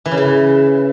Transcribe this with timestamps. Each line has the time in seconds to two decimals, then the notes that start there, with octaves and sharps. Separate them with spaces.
0.06 E3
0.11 C#3
0.17 E3